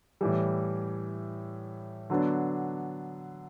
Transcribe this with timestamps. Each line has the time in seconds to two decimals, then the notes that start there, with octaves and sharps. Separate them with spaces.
0.21 A2 E3 G3
2.10 D3 F#3 B3 D4